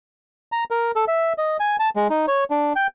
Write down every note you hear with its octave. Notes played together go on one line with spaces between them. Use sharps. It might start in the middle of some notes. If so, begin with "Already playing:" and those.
A#5
A#4
A4
E5
D#5
G#5
A5
G#3
D#4
C#5
D4
G5